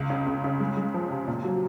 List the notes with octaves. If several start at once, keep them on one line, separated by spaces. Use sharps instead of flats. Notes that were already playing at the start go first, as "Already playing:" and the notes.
Already playing: C#2
C#3
C#2
C#3
G#3
G#3
F3
C3
A#2
F#3